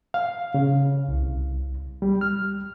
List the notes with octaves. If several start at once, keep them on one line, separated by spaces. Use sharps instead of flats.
F5
C#3
C2
G3
F6